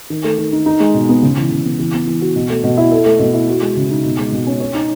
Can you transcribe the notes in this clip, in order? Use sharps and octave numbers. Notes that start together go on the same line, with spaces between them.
D#3
A3
D#3
D#4
D#4
G#3
B2
B3
C#3
E3
C#3
B3
E3
B3
E3
F#4
B2
A3
B2
E4
A4
A3
B2
E4
F#4
G#3
C#3
D#4
B2
G#3
B2
C#4
C#5
D#4